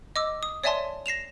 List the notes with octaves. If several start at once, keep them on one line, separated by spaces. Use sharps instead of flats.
D#5 D6 E6
D#6
C#5 D5 E5 G#5 A5 C6
A#6 C7 E7 F7